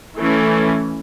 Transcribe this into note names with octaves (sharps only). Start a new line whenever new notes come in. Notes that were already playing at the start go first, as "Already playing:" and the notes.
E3 A3 C#4